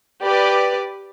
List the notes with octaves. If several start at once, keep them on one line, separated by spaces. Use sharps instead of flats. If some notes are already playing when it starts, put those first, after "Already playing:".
G4 B4 D5